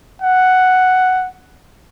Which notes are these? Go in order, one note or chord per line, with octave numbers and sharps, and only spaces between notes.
F#5